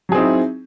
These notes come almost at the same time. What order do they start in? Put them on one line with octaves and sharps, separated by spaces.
F#3 G#4 C4 D#4 E4